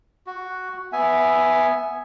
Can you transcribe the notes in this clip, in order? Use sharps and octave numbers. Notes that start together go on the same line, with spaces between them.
F#4
B3 E5 G#5